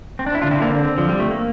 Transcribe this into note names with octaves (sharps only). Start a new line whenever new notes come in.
C4
D4
E4
D3 D4 F4
C4 E4
A#3 D4
C4
F3
G3
A3
A#3